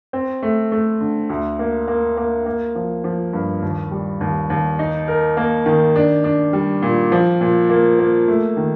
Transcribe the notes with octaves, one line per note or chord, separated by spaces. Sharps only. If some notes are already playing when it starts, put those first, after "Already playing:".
C4
A3
A3
D3
D2
A#3
A#3
A#3
A#3
F3
F3
G2
D#2
G3
D#2
D#2
D#4
A#4
A#3
D#3
D4
D4
G3
A#2
F3
A#2
A#3
A#3
A3
D#3